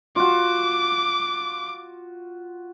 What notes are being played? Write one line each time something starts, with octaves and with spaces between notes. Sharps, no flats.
F4 F#4 D6